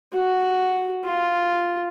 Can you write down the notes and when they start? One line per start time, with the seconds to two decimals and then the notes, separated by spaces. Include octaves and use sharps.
0.13 F#4
1.05 F4